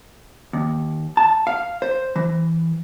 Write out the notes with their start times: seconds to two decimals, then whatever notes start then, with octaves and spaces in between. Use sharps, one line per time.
0.53 D#2
1.17 A5
1.47 F5
1.82 C5
2.16 E3